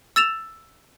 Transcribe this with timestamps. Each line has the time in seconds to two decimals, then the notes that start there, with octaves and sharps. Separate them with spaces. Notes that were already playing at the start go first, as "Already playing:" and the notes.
0.16 E6 A6 E7 F7